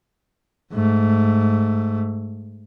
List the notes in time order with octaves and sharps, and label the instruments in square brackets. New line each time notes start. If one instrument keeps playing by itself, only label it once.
[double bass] G#2 A3